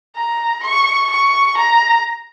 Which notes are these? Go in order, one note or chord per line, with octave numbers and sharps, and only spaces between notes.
A#5
C#6
C#6
A#5